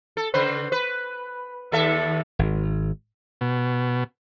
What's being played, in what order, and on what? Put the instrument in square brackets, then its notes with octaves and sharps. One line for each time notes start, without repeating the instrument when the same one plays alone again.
[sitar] A4
C#3 B4 C5
B4
D#2 A4 E5
[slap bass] G#1
[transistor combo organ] B2